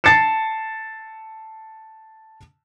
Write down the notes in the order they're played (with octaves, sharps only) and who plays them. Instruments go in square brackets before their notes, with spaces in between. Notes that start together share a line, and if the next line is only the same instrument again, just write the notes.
[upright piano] A5 A6 C7 C#7 E7